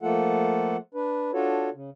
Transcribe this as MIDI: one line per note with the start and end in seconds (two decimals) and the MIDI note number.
0.02 0.77 53
0.02 0.77 57
0.02 0.77 58
0.02 0.77 65
0.02 0.77 69
0.02 0.77 78
0.94 1.31 62
0.94 1.31 71
1.33 1.70 62
1.33 1.70 65
1.33 1.70 66
1.33 1.70 69
1.33 1.70 73
1.74 1.90 49